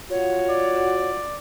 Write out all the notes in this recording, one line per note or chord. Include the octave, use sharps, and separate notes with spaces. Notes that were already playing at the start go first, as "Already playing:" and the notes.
F4 F#4 C#5
D5